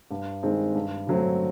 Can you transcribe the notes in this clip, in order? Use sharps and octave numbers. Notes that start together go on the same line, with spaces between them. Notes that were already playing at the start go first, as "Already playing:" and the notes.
G2
D#3 G#3 C4
G2
D3 F#3 A3 C4